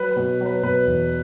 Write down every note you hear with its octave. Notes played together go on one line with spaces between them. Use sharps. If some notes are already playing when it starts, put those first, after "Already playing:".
Already playing: F#3 B4
B4
B2
F#3
B4
B2 B4
E2